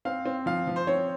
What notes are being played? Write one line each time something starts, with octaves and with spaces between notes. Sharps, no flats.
C4 F5
C4
F3 F5
F3
C5
C4 C#5